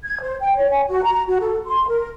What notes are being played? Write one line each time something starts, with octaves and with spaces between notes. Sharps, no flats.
G#6
C5
G5
C#5
G#5
F#4
A#5
F#4
A4
C6
A#4